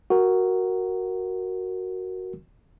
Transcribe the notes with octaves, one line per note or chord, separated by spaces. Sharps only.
F#4 A#4